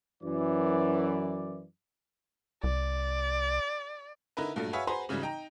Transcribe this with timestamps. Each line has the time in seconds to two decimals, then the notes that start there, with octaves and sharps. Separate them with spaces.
0.23 F#2 E3 D5
2.64 C2 D5
4.37 D3 D#4 E4 A#4 B4
4.56 G2 A#2 F#3 A3
4.73 F#4 G#4 B4 C#5 E5 F5
4.87 F#4 G#4 B4 C5 A#5 C6
5.09 G#2 C#3 E3 F#3 G3
5.22 D#4 G5 A#5